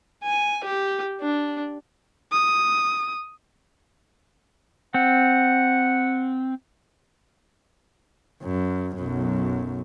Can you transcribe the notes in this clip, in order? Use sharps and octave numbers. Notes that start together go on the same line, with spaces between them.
G#5
G4
D4
D#6
C4 F#5
F#2
B1 F#2